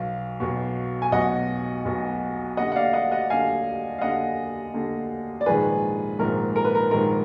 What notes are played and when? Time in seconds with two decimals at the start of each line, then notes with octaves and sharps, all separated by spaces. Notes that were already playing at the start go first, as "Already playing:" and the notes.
Already playing: B1 B2 F5
0.40 B1 B2
1.02 G#5
1.12 B1 B2 D#5 F#5
1.85 B1 B2
2.57 D#2 D3 D#5 F#5
2.72 F#5
2.75 D5 F5
2.93 D#5 F#5
3.11 D#5 F#5
3.30 D#2 D3 F5 G#5
3.98 F5
4.01 D#2 D3 D#5 F#5
4.74 D#2 D3
5.41 D5
5.46 A#1 G#2 D#3 G#4 B4
6.19 A#1 G#2 D#3 A#4
6.56 A#4
6.65 B4
6.75 A#4
6.91 A#1 G#2 D#3 A#4